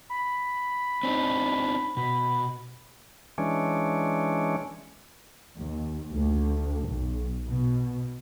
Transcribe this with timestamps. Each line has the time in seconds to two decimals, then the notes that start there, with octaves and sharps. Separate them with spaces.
0.10 B5
1.03 C4 D4 D#4
1.97 B2 B5
3.38 E3 G#3 C#4 D4
5.55 D#2
6.12 D2
6.87 B1
7.48 B2